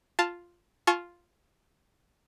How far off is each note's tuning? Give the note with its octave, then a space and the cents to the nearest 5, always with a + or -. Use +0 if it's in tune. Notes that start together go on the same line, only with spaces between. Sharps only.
F4 +0 A5 +0
F4 +0 A5 -45 C#6 -20